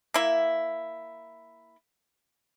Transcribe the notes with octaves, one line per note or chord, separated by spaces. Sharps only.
A#3 E4